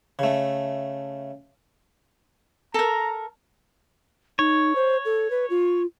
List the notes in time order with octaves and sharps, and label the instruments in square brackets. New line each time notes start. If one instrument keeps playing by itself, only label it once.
[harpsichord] C#3 A3
[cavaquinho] A4 A#4 [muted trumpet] A#5
[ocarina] D#4 [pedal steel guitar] C#5
[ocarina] C5
A4
B4
F4